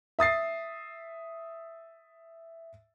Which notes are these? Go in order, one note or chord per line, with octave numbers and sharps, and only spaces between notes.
E5 D#6 A6 C7